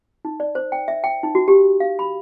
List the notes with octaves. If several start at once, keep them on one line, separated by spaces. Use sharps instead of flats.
D#4
D5
C5
G5
E5
G5
D#4
F#4
G4
F5
B5